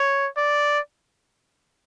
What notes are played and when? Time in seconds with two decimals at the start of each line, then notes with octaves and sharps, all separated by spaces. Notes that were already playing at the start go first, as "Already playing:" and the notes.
Already playing: C#5
0.38 D5